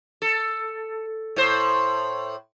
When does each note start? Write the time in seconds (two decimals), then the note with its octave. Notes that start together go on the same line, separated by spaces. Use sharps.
0.22 A4
1.36 A2 C5